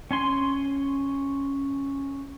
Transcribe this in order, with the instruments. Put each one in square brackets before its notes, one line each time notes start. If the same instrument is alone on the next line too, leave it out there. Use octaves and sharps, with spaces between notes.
[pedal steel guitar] C#4 G#5 C6